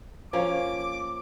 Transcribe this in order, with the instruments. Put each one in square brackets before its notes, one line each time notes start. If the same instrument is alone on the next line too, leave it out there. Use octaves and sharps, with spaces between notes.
[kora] F3 A#3 C#4 [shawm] D6